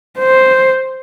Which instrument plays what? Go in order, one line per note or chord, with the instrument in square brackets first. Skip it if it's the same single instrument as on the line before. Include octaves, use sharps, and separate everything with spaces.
[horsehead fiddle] C5